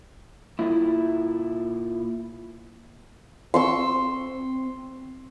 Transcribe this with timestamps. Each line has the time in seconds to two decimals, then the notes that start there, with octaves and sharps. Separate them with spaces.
0.59 A#2 E4
3.54 C4 C6 C#6 E6